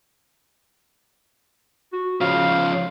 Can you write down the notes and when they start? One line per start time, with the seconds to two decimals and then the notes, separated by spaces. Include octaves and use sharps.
1.93 F#4
2.21 C#3 F3 F5